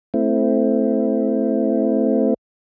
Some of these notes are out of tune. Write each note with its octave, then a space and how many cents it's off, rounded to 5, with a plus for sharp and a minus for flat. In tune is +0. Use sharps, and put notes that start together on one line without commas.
A3 +0 C4 +0 E4 +0